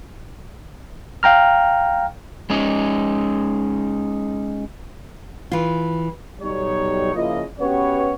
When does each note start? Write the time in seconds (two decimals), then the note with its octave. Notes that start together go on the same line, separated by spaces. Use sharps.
1.23 F5 G5 A#5 F6
2.50 G#3 C#4 D#4
5.51 E3 F4
6.41 B1 G3 D#4 C#5
7.15 C#3 F3 A#3 E4 F4 D#5
7.60 B3 C#4 F#4 G4 B4 C#5